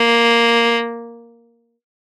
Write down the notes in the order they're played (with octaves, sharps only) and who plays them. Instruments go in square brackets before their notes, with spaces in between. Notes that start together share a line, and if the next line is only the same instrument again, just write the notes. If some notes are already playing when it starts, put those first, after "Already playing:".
Already playing: [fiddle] A#3